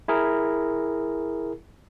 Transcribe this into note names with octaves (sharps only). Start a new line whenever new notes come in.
E4 G#4 A#4